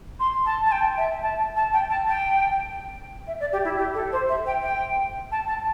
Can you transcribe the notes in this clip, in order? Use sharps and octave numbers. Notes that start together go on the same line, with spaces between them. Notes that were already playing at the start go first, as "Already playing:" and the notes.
C6
A5
A5
G5
E5
A5
A5
G5
A5
G5
E5
D5
G4
E4
G4
A4
C5
E5
G5
G5
A5
A5